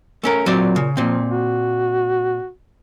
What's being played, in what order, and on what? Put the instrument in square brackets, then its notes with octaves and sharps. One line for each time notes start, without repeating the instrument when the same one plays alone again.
[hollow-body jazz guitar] A3 C#4 A#4
[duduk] A#2 [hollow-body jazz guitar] F#3 C4 D5
[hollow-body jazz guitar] C#3
[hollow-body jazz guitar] A#2 C4 [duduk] F3
[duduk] F#4